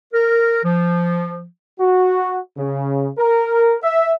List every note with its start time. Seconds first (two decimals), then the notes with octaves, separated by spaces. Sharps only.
0.13 A#4
0.63 F3
1.80 F#4
2.57 C#3
3.18 A#4
3.83 E5